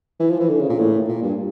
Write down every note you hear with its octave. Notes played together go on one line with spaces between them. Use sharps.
E3
F3
E3
D3
C#3
A#2
A2
A#2
G2